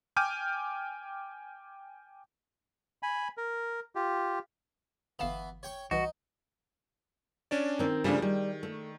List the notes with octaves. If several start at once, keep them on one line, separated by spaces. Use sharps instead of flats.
G5 G#5 D6 F6 G6 D#7
G#5 B5
A#4
F4 G4
G1 E3 B3 F5 E7
C#5 G5 C#6
C2 E3 D#4 F#4
C#4 D4 D5
D#3 C4
C#3 F3 G3 A3 A#3 D4
D#3 G3
A3